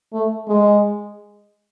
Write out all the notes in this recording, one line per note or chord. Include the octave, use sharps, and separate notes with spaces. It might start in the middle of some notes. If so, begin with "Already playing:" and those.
A3
G#3